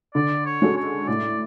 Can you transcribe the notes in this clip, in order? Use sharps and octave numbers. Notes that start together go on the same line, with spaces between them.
D3 D5
C#5
G#3 C#4 F#4 A4
C#5
A2 D5